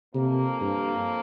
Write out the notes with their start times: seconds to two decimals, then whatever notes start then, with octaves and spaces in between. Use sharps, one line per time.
0.14 F2 C3 F3 A#3
0.61 G2